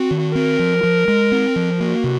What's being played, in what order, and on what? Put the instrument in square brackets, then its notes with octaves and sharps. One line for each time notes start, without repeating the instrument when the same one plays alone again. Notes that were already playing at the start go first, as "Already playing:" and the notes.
Already playing: [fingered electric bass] C4 [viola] F#4
[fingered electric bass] D#3
[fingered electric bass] C4 [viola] A#4
[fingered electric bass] F3
F3
G#3
C4
F3
[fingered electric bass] A#3 [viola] F#4
[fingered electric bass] C3